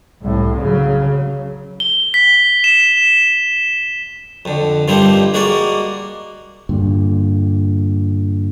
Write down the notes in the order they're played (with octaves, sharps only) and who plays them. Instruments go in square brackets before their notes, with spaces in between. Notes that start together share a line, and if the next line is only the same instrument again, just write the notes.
[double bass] C2 A2
C#3 F#3
[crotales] G7
B6
E7
[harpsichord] F2 D3
G2 F3 G3 A#3 C4 D#4
G#3 A#3 F#4 A#4 D5
[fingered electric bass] G2 A#2 D3